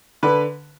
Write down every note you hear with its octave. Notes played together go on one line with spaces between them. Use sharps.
D3 B4